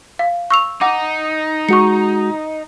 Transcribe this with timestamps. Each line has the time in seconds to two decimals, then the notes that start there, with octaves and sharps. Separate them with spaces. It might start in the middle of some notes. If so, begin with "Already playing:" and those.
0.19 F5
0.50 C#6 E6 F7
0.81 D#4 F#5 D6
1.69 G#3 F#4 C#6 C#7